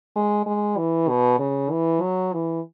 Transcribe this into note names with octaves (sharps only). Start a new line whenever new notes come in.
G#3
G#3
E3
B2
C#3
E3
F#3
E3